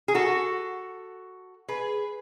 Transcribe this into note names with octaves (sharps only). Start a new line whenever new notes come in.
G#4
F#4 A4
G#4 B4